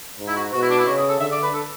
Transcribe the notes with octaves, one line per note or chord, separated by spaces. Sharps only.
G#2
E4
F#4
B2 F#4
E4
D4
E4
C#3 F#4
G#4
A4
D3 E5
D5
B4
A4